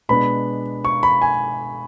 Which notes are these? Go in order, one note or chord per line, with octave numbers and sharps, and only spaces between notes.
B2 G#3 B3 D4 B5
C#6
B5
G#5